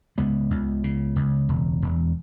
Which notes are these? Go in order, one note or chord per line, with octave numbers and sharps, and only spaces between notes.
C#2 G#3 B3
C#2
C#3
C#2
E1
E1